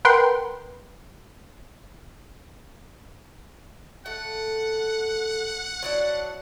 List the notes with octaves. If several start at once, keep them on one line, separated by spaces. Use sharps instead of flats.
A#4 B4 F#5 G5 C6
A3 F#5
F#3 D4 E4